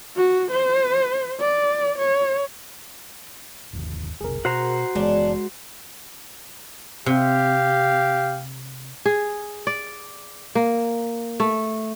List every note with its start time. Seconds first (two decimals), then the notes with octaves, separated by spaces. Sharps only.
0.16 F#4
0.51 C5
1.40 D5
1.98 C#5
3.73 G1 D#2
4.21 F1 B1 C3 G#4 A#4
4.45 B2 F#4 C5 A#5
4.95 F#1 E3 G#3 B3 C#4 D4
7.06 C3 G4 F5
9.06 G#4
9.67 D5
10.55 A#3
11.40 A3